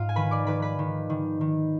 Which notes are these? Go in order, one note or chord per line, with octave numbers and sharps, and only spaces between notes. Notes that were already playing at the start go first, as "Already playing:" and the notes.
Already playing: G#2 F4 F5
G#5
D#3 B4 B5
D5 D6
D#3 B4 B5
B4 B5
D#3
D#3
D#3